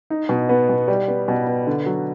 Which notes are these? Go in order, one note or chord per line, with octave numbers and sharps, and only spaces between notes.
D#4
B2
B3
B2
G3
B3
B2
B3
D3
F#3